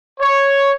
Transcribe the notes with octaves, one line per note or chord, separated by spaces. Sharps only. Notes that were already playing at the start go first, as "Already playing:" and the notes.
C#5